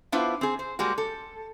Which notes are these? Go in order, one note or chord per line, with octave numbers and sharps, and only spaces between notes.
B3 D4 E4 F4 B4 C5
C4 G#4
C5
G3 G#3 A#3 F#4
A4